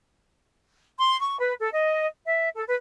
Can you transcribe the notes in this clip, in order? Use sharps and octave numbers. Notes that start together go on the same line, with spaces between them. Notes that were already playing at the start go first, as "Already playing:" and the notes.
C6
C#6
B4
A4
D#5
E5
A4
B4